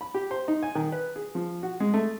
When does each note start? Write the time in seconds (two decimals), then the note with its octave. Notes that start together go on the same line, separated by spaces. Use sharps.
0.01 B5
0.14 G4
0.31 C5
0.48 D#4
0.63 G#5
0.75 D#3
0.92 B4
1.16 G#4
1.35 F3
1.63 F#4
1.80 G#3
1.94 A3